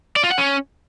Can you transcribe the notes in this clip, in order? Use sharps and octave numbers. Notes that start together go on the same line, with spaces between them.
D5
F4
F#5
C#4